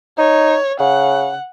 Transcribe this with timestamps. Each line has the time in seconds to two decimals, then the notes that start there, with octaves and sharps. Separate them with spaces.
0.18 D#4 C#5
0.80 C#3 F#5